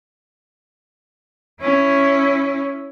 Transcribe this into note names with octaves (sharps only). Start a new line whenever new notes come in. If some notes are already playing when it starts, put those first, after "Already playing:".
C#4 E4